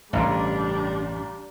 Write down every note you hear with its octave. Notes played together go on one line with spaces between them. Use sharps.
A1 G2 C#3 G3 D4 F5 A#5 C6